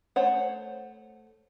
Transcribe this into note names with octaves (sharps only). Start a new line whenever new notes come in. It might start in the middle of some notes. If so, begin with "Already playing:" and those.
A3 C5 C#5 F#5